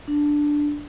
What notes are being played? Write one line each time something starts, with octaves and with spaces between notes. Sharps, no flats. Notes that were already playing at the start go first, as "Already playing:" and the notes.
D4